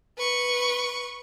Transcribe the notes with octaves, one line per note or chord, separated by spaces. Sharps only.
B4 C#6